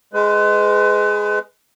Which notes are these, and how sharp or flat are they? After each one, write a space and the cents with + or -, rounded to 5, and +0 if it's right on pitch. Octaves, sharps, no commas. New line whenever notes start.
G#3 +5 B4 +30